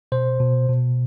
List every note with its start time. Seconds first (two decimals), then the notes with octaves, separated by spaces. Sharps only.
0.12 B2 C5
0.40 B2
0.69 B2